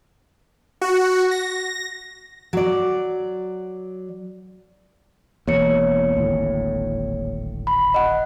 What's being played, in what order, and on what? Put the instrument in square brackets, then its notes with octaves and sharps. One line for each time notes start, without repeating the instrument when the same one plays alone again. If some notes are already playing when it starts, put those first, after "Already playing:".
[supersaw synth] F#4
A#6
[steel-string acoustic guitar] F#3 D5
[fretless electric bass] E1 E2 [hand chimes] A#3 C#5 C#7
[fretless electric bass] D1 G#1 A2
[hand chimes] B5
D#5 F#5